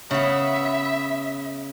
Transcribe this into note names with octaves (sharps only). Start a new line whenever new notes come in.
C#3 B3 E5